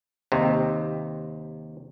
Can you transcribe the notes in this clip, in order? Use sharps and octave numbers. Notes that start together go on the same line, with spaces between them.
D#2 C3